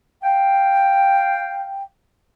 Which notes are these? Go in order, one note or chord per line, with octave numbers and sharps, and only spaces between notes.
F5 G5